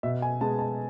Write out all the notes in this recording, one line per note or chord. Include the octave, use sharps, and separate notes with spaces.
B2 E5
G#5
G#3 B3 A5
A5